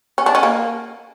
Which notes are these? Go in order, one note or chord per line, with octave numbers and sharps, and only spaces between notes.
C#4
D4
C#4
A#3